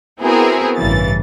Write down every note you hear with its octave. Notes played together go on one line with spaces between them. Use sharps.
B3 C4 E4 F#4 G#4 A#4
A1 G2 C#3 E3 A6